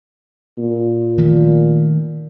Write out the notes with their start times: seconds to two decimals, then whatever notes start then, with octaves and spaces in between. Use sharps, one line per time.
0.58 A#2
1.18 D#3 F3 A3